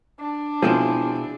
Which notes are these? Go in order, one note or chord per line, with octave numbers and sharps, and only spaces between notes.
D4
B2 F3 C4 E4 G#4